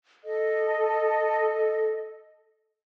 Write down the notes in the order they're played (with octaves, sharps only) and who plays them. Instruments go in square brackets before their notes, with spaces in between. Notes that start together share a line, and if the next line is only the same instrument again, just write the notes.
[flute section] A4 D#5